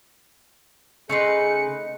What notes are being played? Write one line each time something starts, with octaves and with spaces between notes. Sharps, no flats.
C#3 A3 D#4 G#4 B4 C6 C#7